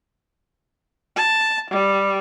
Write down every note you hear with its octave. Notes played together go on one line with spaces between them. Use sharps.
A5
G3